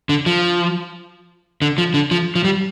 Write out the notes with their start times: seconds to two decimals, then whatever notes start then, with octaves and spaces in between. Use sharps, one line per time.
0.09 D3
0.26 F3
1.62 D3
1.78 F3
1.94 D3
2.11 F3
2.35 F3
2.44 G3